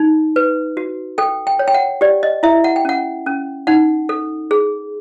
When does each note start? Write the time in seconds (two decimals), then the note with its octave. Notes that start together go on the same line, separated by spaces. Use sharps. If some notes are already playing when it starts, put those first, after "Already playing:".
Already playing: D#4
0.36 B4
0.77 F#4
1.18 A4 G5
1.47 G5
1.59 C#5
1.68 G5
1.74 F#5
2.01 G4 D5
2.23 D#5
2.43 E4 E5
2.64 F#5
2.76 G5
2.85 C#4 F#5
3.26 C#4
3.67 D#4 F#5
4.09 A4
4.51 G#4